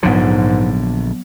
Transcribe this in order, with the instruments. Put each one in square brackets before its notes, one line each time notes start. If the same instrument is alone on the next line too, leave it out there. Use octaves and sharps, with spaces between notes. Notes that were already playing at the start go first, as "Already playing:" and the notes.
[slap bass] A#1 D3 [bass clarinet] G#2 [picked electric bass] F#3 B3